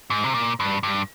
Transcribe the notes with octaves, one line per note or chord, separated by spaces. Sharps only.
G#2
C3
A#2
G2
G2